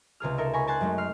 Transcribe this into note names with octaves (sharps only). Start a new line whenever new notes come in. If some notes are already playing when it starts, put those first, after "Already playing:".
C#2 C3 G#4 F6
D#4 A4 A#4 E5
G#5 A#5 B5 C#6
G#5 A5 C6 F#6 G#6
F#2 G#3 A3 D#4
F6 C7